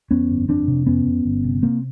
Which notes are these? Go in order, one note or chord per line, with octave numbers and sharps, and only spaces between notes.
F2 B3 C#4
G1
F2 C4 D4
C3
F2 B3 C#4
F2
G1
C3
C3 A#3 C4